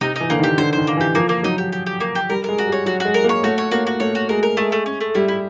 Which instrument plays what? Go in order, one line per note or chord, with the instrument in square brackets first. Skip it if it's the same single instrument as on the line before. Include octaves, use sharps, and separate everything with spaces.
[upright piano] C3 [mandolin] D#4
[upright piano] E3 [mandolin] D#4
[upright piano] D3 [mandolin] A#3
[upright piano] D#3
[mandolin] G4
[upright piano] D3 [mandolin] C5
[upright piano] D#3 [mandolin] C5
[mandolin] A#3
[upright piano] E3
[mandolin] G4
[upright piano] F3 [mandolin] A#3
[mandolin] A#3
[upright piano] F#3 [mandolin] D#4
[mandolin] G4
G4
G4
A#3
G4
[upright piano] G3 [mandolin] A#4
[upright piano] G#3 [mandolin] A#4
[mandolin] F#4
[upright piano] G3
[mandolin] C#5
[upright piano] F#3 [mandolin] F#4
[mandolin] F#4
[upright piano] G#3
[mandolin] A#4
[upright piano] A#3
[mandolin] C#5
[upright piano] A3 [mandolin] F#4
[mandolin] C#5
[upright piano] A#3 [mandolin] F#4
[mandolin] F#4
[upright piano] A3 [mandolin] C#5
[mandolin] F#4
[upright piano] G#3 [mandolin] A#4
[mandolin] A#4
[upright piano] G#3 [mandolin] A3
[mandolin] A3
C#4
A3
[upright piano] G3 [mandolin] E4
[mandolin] E4